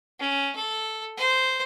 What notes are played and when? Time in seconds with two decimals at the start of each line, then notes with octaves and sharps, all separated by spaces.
0.19 C#4
0.56 A4
1.17 C5